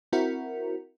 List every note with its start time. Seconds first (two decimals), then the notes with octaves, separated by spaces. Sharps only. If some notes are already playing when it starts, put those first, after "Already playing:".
0.13 C4 E4 F#4 A#4